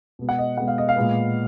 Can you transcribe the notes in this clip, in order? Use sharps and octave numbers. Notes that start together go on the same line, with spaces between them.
B2 G#3 B3
F#5
D#5
B2 G#3 B3 F#5
F5
D#5
F5
A#2 G#3 B3